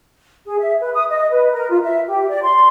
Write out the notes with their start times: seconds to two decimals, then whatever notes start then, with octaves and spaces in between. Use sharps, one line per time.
0.46 G#4
0.60 E5
0.81 B4
0.94 D#6
1.10 D#5
1.30 B4
1.52 A#4
1.70 F4
1.83 E5
2.08 G4
2.29 D5
2.43 C6